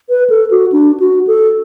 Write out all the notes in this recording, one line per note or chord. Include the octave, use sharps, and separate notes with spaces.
B4
A4
F#4
D4
F#4
A4